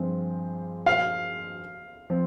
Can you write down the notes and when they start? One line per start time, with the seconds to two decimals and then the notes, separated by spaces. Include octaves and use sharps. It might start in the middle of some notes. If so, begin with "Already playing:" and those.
Already playing: G2 F3 G#3 C4
0.86 F5
2.10 F3 C4